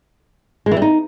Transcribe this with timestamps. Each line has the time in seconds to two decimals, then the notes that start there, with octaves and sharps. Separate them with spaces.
0.66 G#3
0.71 E3
0.77 G3
0.82 D#4